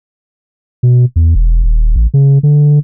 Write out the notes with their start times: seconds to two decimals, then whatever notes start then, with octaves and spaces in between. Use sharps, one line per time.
0.83 B2
1.16 E2
1.35 E1
1.64 D#1
1.96 A1
2.14 C#3
2.43 D3